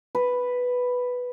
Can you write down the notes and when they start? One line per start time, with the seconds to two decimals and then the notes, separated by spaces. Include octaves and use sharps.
0.15 B4